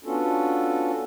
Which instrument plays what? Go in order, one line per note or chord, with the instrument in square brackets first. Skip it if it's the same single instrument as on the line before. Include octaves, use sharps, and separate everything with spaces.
[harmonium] B3 C#4 D4 F4 F#4 A4